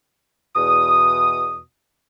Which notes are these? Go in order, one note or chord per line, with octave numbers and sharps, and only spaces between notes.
E2 B2 D#6